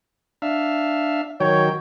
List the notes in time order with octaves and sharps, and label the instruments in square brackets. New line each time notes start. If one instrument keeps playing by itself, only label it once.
[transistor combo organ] D4 E5 F5
[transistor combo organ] D#3 F#3 G5 [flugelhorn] C#5